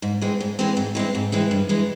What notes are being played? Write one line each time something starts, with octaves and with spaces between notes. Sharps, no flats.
G#2
E3 G#3 C4
G#2
E3 G#3 C4
G#2
E3 G#3 C4
G#2
E3 G#3 C4
G2
E3 G#3